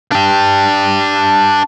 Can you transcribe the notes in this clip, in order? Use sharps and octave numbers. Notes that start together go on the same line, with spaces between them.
D4 G4